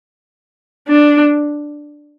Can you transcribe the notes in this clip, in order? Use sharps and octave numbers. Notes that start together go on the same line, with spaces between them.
D4